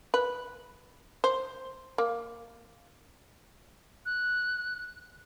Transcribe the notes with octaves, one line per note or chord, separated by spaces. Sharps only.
B4
C5
A#3
F#6